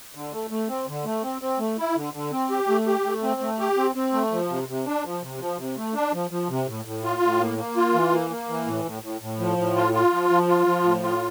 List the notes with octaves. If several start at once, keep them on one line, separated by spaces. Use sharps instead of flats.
D3
A3
A3
C4
D3
A3
C4
C4
A3
E4
D3
D3
C4
G4
A3
G4
A3
C4
A3
G4
C4
C4
A3
F3
C3
C3
D4
F3
C3
F3
C3
A3
D4
F3
F3
C3
A2
A2
F4
A2
A#3
A#3
F4
E3
A#3
A#3
E3
A2
A2
A2
A2
F3
A2
F4
F4
F3
F3
F4
F3
A2
F4